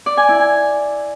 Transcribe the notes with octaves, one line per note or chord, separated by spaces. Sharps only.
D5
G#5
E4
G#5